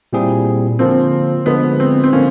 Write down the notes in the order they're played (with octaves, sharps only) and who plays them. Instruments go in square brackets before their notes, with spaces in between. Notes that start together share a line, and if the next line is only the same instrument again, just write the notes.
[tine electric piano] A#2 G3 C4 E4 G#4
[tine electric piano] D3 F3 A#3 [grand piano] C4
[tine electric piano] D3 F3 G#3 [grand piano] B3
[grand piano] C4
C4
[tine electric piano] D3 F3 A#3 [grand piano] C#4